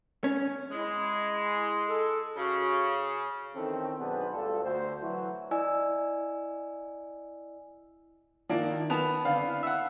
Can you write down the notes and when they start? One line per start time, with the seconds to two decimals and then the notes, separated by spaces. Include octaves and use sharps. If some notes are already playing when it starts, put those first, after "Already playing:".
0.24 C#4
0.71 G#3 E4
1.89 A4
2.36 C#3 F#4
3.55 D#3 E3 C4 C#4 A4
3.98 B1 B3 D4 G#4 B4 C5
4.32 D2 G2 D3 F4 A4
4.64 D2 C5
5.02 E3 F#3
5.51 E4 D5 D#5 G#5 E6
8.49 D#3 F3 A#3 D4 E4
8.90 B3 A#4 A5 F7
9.25 D3 C4 D4 F5
9.46 E4
9.63 E5 F#5